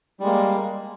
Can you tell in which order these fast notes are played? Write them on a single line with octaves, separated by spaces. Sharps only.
G3 G#3 A#3